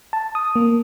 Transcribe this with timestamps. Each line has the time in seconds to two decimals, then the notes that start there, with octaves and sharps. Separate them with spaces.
0.13 A5
0.35 D#6
0.56 A#3